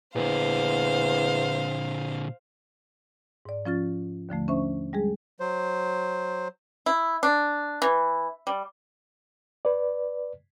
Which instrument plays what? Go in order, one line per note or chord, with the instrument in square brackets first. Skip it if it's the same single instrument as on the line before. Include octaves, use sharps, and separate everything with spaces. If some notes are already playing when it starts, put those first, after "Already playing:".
[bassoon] E2 [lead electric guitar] A#2 D3 [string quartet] C5 F5
[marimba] G#2 D5
F3 C#4 F4 A6
D#2 D3 F3 A3
C#4 D4 C5 E5 C#6
G3 G#3 G#4
[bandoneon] F#3 C5
[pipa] E4
D4
E3
G3
[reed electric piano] B4 D5